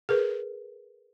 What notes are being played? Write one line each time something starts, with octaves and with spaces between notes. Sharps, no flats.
G#4 A#4 B4